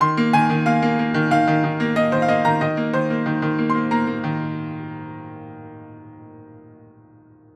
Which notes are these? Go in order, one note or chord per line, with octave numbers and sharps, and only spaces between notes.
D#3 C6
A#3
D#3 G#5
D#3
A#3 F5
A#3
A#3
D#3
D#3 F5
D#3
D#3
A#3
A#3 D#5
D#3 C5
F5
A#3 D#5
D#3 A#5
D#3 D#5
A#3
D#3 C5
A#3
D#3
D#3
A#3
C6
A#3
A#3 A#5
A#3
D#3